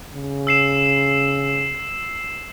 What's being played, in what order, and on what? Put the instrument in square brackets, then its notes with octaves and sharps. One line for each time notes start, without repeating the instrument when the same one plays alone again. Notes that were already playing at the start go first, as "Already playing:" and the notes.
[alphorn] C#3
[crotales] E6 C7 E7